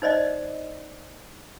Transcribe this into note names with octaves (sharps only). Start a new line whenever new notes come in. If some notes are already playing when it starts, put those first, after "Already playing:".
D#4 C5 D5 D#5